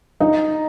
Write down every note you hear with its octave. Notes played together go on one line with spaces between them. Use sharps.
D#4 D#5